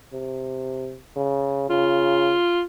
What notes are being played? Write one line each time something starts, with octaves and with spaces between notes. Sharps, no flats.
C3
C#3
C#3 F4